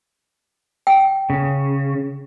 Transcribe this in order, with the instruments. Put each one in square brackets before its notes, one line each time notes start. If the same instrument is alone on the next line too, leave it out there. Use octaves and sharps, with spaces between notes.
[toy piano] G5
[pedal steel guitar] C#3